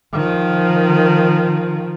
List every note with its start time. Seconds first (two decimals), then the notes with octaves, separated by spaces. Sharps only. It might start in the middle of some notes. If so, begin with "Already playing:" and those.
0.13 D#3 F3